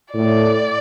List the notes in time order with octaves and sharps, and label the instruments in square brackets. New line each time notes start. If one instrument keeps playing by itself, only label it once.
[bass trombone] A2 [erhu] D5